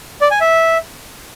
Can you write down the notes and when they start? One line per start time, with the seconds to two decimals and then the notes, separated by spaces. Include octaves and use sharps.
0.21 D5
0.31 G#5
0.41 E5